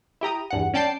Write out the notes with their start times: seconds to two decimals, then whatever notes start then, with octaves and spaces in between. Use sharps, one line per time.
0.21 E4 G4 A#5 D#6
0.50 E2 G2 F#5
0.74 C#4 D5 G5 A5 D6 C7